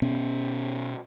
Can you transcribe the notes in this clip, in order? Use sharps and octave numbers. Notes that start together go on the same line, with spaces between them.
B2 B3 C#4